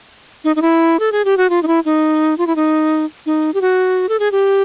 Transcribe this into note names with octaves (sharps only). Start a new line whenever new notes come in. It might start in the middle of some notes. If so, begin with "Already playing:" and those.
D#4
D#4
E4
A4
G#4
G4
F#4
F4
D#4
E4
D#4
F4
E4
D#4
D#4
G4
F#4
A4
G#4
G4